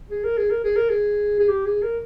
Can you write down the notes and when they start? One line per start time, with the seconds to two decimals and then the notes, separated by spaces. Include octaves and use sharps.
0.11 G#4
0.24 A#4
0.37 G#4
0.50 A#4
0.64 G#4
0.76 A#4
0.89 G#4
1.39 G#4
1.48 G4
1.65 G#4
1.82 A#4